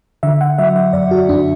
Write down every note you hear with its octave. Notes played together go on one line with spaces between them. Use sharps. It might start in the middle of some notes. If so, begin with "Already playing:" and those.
D3 E5
F#5
F#3 E5
E5
F#2 D5
F#4
F#2 D4